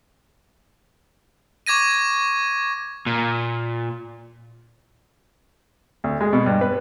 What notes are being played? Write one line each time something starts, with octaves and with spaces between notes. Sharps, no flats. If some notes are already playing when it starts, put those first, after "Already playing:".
C#6 D6 G#6 A#6 D#7
A#2
D2
G#3
B2
G2
B4